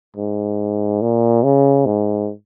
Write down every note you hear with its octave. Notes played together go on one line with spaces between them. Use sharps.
G#2
A#2
C#3
G#2